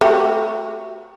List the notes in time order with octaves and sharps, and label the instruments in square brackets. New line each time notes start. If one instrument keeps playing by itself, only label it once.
[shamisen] A3 F#4 G4